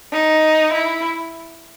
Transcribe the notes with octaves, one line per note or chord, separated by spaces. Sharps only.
D#4
E4